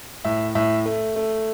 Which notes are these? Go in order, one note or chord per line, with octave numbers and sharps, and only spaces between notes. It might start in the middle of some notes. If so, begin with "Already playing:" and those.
A2 E5
A2 E5
A3
A3